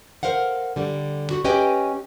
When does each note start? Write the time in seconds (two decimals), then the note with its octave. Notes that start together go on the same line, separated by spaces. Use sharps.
0.23 A#4 C5 F5 F#5
0.76 D3 G3
1.31 F#4
1.44 C#4 G4 B4 D#5 G5 G#5